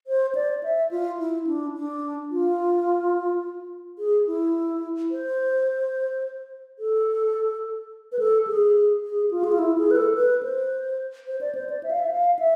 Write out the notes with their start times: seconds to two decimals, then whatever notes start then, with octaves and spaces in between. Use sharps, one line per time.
0.07 C5
0.35 D5
0.63 E5
0.91 F4
1.19 E4
1.47 D4
1.75 D4
2.31 F4
3.99 G#4
4.27 E4
5.11 C5
6.79 A4
8.12 B4
8.19 A4
8.47 G#4
9.03 G#4
9.31 F4
9.44 G#4
9.52 F4
9.59 E4
9.78 G#4
9.91 B4
9.96 A4
10.15 B4
10.43 C5
11.27 C5
11.41 D5
11.55 C5
11.69 D5
11.83 E5
11.91 F5
11.99 E5
12.11 F5
12.39 E5